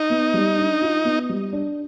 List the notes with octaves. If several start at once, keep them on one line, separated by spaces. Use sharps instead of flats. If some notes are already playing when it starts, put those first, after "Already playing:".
Already playing: D#4
B3
G3
D4
F4
B3
G3
D4